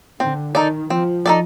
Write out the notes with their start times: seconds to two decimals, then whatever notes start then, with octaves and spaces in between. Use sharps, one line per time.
0.20 D3 C4
0.55 D#3 D#4 A4 D5
0.90 F3 C4
1.26 D#4 A4 D5